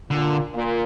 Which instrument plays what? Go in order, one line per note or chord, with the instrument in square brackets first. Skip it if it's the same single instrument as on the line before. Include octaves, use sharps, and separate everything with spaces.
[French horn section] A#2 [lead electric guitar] D3
[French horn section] A#2